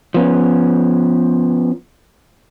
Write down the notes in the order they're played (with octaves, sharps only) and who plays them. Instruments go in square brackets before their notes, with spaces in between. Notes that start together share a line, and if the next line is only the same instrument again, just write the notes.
[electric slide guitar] F3 B3 C#4